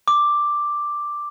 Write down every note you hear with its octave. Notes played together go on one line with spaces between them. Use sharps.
D6